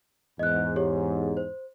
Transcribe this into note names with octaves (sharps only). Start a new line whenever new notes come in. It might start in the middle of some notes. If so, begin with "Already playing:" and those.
E2 G#2 D#5 F#6
G4 G#4 C#5
C5